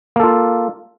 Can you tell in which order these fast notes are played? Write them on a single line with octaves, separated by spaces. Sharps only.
A#3 A4 F4